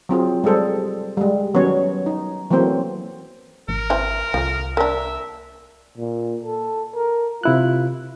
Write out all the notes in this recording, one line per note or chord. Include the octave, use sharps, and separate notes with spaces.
F#3 C4 F4 G#4
G3 G#3 G#4 A4 C5
G3 G#3
D#3 F#3 B3 C#4 C#5
D#4
E3 F#3 A3 A#3 C4 C5
G#1 A#4
E3 C4
C2 F3 A3
A#3 D4 E5
A#2
A4
A#4
C3 E4 F4 F#6